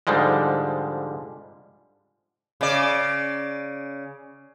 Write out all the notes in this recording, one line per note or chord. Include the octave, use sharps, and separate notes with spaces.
G#2 D3 F3 G3 G#3
C#3 D5